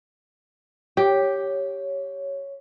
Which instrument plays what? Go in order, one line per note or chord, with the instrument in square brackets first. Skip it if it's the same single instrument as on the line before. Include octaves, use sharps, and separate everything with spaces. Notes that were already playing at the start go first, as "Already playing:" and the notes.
[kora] G4 [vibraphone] C#5